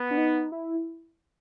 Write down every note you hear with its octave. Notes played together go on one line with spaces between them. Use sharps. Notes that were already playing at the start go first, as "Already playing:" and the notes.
Already playing: B3
D4
D#4
E4